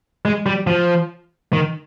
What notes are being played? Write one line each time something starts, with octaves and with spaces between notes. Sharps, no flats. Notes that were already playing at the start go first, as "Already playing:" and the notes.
G#3
G3
F3
D#3